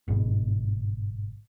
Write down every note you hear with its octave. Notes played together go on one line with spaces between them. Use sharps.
G1 G#2 B2